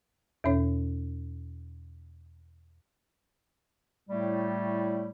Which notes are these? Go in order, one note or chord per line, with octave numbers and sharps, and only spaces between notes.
E2 B2 C#4 C#5
A2 G3 A3 E4